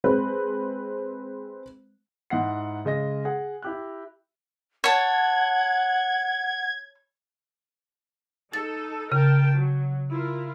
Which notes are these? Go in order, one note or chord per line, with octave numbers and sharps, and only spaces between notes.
G#3 C4 B4
G#2 E4 F#5 C7
C#3 G#3 D#5 A#6
G#4 F#5 G#5
E4 G4 F#6
C#5 F#5 A5 G#6
D#4 A4 A6
C#3 A#4 G5 A5
F#3
E4 F4 A#4